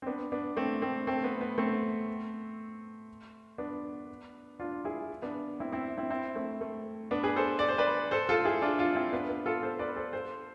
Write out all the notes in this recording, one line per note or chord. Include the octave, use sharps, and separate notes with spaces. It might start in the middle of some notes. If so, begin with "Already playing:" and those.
C4
B3 D4
B3 D4
A3 C4
A3 C4
A3 C4
B3
B3
A3 C4
B3 D4
D4 F4
E4 G#4
B3 D4
C4 E4
C4 E4
C4 E4
C4 E4
A3 C4
A3
B3 D4
G#4 B4
A4 C5
D5
C5
B4 D5
A4 C5
F4 A4
E4 G#4
D4 F4
D4 F4
C4 E4
B3 D4
B3
F4 A4
A4 C5
B4 D5
A4 C5
A4 C5